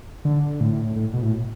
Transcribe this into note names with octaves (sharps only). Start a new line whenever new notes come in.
D3
A2
A2
B2
A2